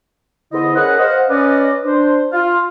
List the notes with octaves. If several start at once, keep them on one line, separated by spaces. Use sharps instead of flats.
E2 D3 E4 C5 D#5
C#4 G#4 A#4 B4 D#5 F#5
C5 D#5 F5 F#5
C#4 B4 D5 D#5
D4 C5
F4